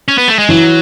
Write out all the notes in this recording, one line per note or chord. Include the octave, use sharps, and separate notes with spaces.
C#4
B3
A3
G#3
E3 F#3